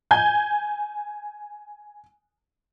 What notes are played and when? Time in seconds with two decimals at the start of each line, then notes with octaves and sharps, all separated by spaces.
0.11 G#5 G6 G#6